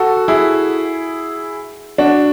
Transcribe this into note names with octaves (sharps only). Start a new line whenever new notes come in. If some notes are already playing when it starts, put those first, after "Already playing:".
Already playing: F#4 A4
A4
E4 G#4
D4 F#4